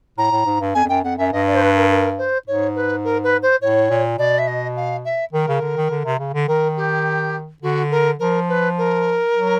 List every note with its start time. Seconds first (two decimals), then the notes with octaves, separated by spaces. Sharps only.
0.18 A2 A#5
0.31 A2
0.46 G#2
0.60 G2
0.74 F2 G#5
0.85 F2
0.88 F#2 G5
1.04 F2 F#5
1.18 F#2 E5
1.32 G2 D#5
1.47 D5
1.55 C5
1.61 B4
1.76 A#4
1.90 A#4
2.18 C5
2.47 G#2 C#5
2.75 B4
3.04 A#4
3.23 B4
3.42 C5
3.61 A2 C#5
3.90 A#2
4.18 B2 D5
4.38 E5
4.47 D#5
4.76 F5
5.05 E5
5.33 D#3 A#4
5.48 C#3
5.61 D3
5.77 D#3
5.90 D3
6.05 C3
6.19 C#3
6.33 D3
6.48 D#3 A#4
6.76 G4
7.62 D3 F#4
7.91 A#4
8.19 F3 A#4
8.49 B4
8.78 A#4
9.35 F#3